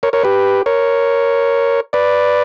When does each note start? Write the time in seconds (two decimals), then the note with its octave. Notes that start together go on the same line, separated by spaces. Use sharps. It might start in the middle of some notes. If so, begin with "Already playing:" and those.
0.03 A#4 C#5
0.13 A#4 C#5
0.23 G4 B4
0.66 A#4 C#5
1.93 B4 D5